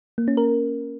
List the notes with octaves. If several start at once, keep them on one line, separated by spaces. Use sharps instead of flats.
A#3
C#4
A#4